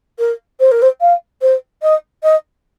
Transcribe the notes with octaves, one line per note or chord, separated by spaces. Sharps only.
A#4
C5
A#4
C5
F5
C5
D#5
D#5